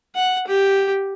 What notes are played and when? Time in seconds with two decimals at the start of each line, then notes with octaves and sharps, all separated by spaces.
0.16 F#5
0.47 G4